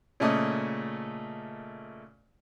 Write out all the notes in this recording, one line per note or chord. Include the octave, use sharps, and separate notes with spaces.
A#2 C#3 A3 D#5 D#6